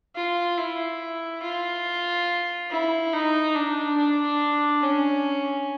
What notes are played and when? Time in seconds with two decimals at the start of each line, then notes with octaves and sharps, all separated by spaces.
0.16 F4
0.58 E4
1.43 F4
2.71 E4
3.13 D#4
3.55 D4
3.97 D4
4.83 C#4